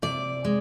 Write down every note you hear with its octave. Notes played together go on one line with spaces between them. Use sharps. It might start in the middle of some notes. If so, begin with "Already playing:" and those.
C3 D5
G#3